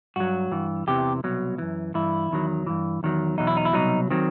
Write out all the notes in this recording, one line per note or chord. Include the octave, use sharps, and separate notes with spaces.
G2 F#3 F#4
G2 E3
E2 C3 E3 G4
C2 B2 F#3
F#2 E3
G2 E3 E4
E2 D#3 F#3
G2 E3
E2 D#3 F#3
E2 B2 F#3 D#4
E4
D#4
E4
C2 B2 F#3 D#4
D#3 F#3 C4